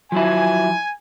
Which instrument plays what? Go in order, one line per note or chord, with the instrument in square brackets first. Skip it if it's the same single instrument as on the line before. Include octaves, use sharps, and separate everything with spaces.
[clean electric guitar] F3 F#3 E4 [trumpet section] G#5